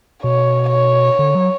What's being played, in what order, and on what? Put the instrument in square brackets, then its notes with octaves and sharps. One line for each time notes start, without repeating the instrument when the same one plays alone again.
[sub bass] B2 [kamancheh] C#5
[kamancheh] C#5
[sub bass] D3
F#3